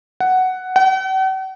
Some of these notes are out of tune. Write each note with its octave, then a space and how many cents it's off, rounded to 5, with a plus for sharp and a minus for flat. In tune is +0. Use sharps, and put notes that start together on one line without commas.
F#5 +5
F#5 +45